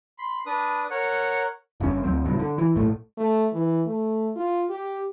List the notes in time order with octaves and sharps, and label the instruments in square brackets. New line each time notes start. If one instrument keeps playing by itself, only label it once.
[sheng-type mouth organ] B5 C6
D4 B4 D#6
A#4 C#5 F#5
[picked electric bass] F#1 G2 B2 C#4
D2 F#3 C4
D1 C#2 G2 B2
D3
E3
A#1 A2 A3
[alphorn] A3
E3
A3
F4
G4